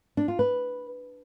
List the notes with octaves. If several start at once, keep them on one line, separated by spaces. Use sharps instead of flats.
D4
F4
B4